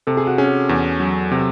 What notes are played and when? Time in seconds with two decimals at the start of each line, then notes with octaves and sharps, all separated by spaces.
0.07 C3 A4
0.17 G#4
0.27 F#4
0.38 C#4 G#4
0.69 E2
1.00 F#3
1.31 C3